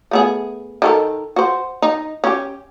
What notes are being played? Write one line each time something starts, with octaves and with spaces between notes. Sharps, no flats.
A3 B3 G#4
D#3 A4 A#4
F#4 C5
D#4
C#4 G4